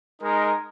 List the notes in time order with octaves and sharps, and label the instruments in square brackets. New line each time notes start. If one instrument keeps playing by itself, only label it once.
[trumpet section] G#3 D#4 A#4